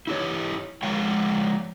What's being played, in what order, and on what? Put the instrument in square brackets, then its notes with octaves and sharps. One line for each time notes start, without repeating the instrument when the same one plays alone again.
[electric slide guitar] E4 G4 C#5
F3 G#3 C#5 F5 G5